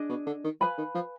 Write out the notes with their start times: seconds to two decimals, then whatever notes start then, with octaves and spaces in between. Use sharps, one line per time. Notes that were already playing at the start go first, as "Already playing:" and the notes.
Already playing: D4 G#4 D#5
0.09 B2
0.26 D3
0.44 D#3
0.61 F3 B4 F5 G#5 B5
0.78 D#3
0.95 F3